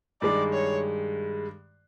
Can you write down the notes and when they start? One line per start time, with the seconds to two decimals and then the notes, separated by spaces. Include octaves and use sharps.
0.22 G2 D#3 G#3 D5
0.54 C#5